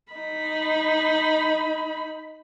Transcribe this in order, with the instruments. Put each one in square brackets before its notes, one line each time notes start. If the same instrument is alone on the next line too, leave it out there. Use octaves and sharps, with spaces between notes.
[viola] D#4 B5